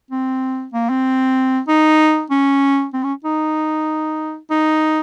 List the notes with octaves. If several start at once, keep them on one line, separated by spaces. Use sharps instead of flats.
C4
A#3
C4
D#4
C#4
C4
C#4
D#4
D#4